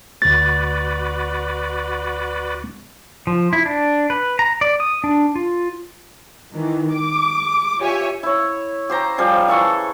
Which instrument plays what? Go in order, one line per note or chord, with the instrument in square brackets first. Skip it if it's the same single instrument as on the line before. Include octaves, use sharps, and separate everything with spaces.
[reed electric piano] D2 A6 [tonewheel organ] F#4 B4 D5
[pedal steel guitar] F3
E4
D4
B4
A#5
D5
D#6
D4
F4
[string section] D#3 E3
D6
F4 G4 C#5 E5 G#5
[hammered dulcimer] E4 C#5
G4 C5 A#5
F3 G3 G#4
E3 A4 C#6